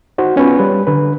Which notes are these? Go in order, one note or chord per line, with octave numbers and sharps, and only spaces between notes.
D#4 F#4 C5
B3 C#4 F4 B4
G3 B4
D3 B4